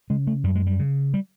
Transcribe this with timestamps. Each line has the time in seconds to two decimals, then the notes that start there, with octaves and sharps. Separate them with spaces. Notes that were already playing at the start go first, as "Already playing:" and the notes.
0.10 C#3 G#3
0.27 A3
0.44 F#2 G3
0.55 G#3
0.67 G3
0.79 C#3
1.14 G3